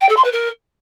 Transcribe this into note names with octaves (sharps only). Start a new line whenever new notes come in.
G5
A4
C6
B4
A#4